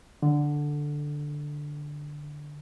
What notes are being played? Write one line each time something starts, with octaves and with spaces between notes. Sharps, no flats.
D3